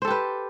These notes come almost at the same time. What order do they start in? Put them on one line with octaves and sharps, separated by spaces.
C5 A4 G4 B4